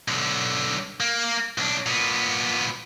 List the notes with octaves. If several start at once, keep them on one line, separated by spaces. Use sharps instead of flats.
B1 D3
A#3
B1 D4
A#2 B3